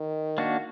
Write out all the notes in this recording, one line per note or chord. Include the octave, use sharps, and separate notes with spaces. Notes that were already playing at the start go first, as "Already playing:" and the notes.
Already playing: D#3
A#3 D4 F#4